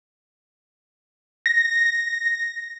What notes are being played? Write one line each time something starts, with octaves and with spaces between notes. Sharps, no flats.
A#6